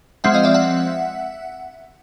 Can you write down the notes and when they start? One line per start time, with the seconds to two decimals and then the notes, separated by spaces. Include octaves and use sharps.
0.24 F3 G#3 C4 E5 F#5
0.34 D#5 F5
0.44 D5 E5
0.54 E5 F#5